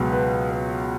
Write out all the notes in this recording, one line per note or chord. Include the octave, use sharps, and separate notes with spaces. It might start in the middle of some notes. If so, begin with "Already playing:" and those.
Already playing: C#2 B2 F#3 B3 B4
B4
B4